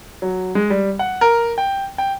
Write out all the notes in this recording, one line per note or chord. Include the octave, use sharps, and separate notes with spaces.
F#3
G#3
G3
F#5
A#4
G5
G5